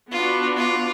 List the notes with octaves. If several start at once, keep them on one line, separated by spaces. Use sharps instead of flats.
B3 D4 F4 F#4
F4